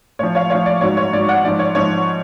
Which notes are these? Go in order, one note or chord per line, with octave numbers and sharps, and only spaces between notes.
A2 F3 C#5
C#5 F5
A2 F3 C#5 F5
D5
G#2 F#3 C#5
C#5
G#2 F#3 D5
D5 F#5
G#2 F3 D5
C#5
G#2 F3 C#5